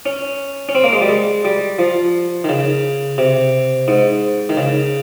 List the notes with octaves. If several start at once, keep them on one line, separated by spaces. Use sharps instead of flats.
C#4
C#4
C4
A#3
G#3
G3
G#3
G3
F3
D#3
C#3
C3
G#2
D#3
C#3